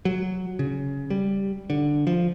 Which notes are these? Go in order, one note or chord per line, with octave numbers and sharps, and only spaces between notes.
F#3
C#3
G3
D3
F3